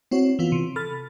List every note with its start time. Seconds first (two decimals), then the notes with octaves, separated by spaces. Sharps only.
0.11 C4 E4 F#4 C#5
0.39 E3 B3 F4
0.52 C3
0.76 A4 B5 F6 A6